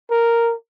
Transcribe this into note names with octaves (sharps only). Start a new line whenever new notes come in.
A#4